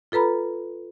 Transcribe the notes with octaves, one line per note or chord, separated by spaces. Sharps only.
F4 A4 B4 A#5 B5